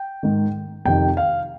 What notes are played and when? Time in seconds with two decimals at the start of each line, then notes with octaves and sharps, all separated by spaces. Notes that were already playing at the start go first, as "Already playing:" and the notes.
Already playing: G5
0.23 G#2 D#3
0.85 F2 C3 D#3 G5
1.17 F5